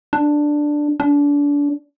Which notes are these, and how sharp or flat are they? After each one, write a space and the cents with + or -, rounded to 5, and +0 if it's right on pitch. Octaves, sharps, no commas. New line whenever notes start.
D4 +5
D4 -30